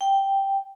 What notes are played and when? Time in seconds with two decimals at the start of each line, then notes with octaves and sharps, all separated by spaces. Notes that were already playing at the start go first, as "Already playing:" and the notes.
0.01 G5